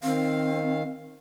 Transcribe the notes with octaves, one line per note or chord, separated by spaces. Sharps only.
D#3 C4 F5